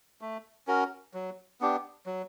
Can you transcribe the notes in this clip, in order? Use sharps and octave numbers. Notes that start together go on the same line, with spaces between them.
A3
C#4 F#4 A#4
F#3
B3 D4 G4
F#3